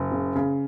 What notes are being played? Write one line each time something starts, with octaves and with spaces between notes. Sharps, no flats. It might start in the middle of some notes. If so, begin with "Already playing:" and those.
Already playing: F#1
C#3
C#3